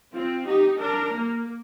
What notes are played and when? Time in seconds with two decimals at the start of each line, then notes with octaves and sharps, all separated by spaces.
0.13 C4 F4
0.46 D#4 G4
0.79 D4 A#4
1.12 A#3